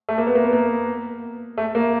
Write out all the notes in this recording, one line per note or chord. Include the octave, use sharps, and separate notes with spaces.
A3
A#3
B3
A#3
B3
A#3
A3
A#3